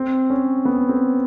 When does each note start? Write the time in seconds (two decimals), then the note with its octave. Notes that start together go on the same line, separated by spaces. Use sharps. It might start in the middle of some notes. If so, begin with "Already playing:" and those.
Already playing: C4
0.30 C#4
0.65 B3
0.89 C4